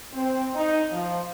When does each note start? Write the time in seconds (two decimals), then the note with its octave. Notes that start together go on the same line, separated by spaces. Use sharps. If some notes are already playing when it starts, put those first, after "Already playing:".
0.14 C4
0.55 D#4
0.92 F3